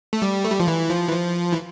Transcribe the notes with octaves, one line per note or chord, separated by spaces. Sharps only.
A3
G3
A3
G3
F3
E3
F3
E3
F3
E3